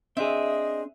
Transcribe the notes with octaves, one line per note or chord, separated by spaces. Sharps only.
C4 D4 G#4 D#5 E5